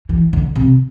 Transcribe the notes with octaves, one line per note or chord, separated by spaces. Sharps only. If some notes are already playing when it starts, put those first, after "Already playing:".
E3
D3
C3